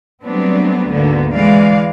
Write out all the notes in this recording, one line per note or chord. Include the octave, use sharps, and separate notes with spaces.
F#3 G3 A3 B3 C4 D4
D2 G#2 D3 A#3 B3
E3 G#3 D5 F5